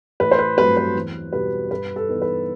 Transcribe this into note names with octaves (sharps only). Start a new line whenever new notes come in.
A1 B4
C5
B4
G2 F#3 A3 C4 B4
B4
E2
B2 G3 B4
G2 B4
A4
E3 B3 D#4
B4